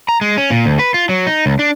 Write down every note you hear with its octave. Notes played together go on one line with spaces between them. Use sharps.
A#5
G#3
C#4
A#2
D2
B4
F4
F#3
D#4
C#2
D4